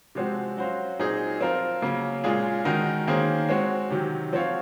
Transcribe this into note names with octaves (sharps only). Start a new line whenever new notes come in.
C3 F3 G#3 C4 F#4
F#3 C#4 F#4 C5 F5
A#2 F#3 C4 D#4 G#4
F3 C4 F4 A#4
C#3 F#3 A#3 C#4
A#2 G#3 C#4 F4 G#4
D#3 G#3 D#4 F#4 A#4
D#3 A#3 C#4 G#4 C5
G#3 C4 F#4 C#5
C3 D#3 F#3
F3 C4 F#4 C#5 F5